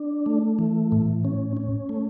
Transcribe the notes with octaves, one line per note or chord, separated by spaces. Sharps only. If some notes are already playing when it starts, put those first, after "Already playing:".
Already playing: D4
A3
E3
A2
C#4
C#4
A3